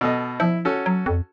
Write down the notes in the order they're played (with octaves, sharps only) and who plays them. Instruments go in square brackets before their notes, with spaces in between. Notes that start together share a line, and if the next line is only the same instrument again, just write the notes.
[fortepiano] B2 A4 D#5
[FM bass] F3 [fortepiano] E4
[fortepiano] C#4 F#4 A4
[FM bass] F#3
F2